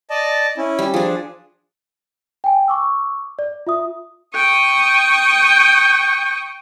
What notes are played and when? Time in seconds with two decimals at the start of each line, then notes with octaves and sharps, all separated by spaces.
0.10 D5 D#5 A5
0.57 C#4 E4
0.79 G3
0.94 F3 D4 G#4
2.44 G5 G#5
2.68 C#6 D6 E6
3.39 D5
3.67 F4 E5 D#6
4.34 G5 C#6 D#6